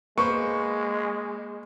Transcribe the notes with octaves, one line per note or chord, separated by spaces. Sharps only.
G#3 A#3 B4 C5 C#6